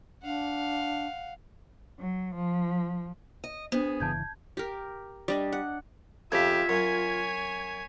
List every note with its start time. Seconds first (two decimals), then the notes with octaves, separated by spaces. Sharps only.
0.23 D4 F5 F#5
2.00 F#3
2.35 F3
3.44 D#5
3.72 B3 D4 G#4 C5
4.00 G1 C#3 E3 A5 G6 G#6
4.57 G4 A#4
5.28 G3 D4 D#5
5.53 F#5
6.32 F2 C#3 F3 F4 G4 E5 G#6 B6
6.69 F#2 C#5 G#5